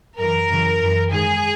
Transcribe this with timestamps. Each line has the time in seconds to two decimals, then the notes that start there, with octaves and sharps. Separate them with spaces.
0.18 F#2 E3 A#4
0.49 F#2 C#3 E3
0.80 F#2 E3
1.11 G#2 D#3 G#4